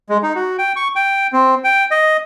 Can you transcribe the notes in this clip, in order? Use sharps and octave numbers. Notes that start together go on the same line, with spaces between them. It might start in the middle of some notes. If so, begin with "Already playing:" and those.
G#3
D#4
F#4
G5
C#6
G5
C4
G5
D#5